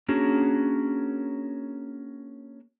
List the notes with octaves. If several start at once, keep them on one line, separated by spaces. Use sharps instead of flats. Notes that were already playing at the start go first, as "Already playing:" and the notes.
A#3 C#4 D4 F#4 G#4 A#4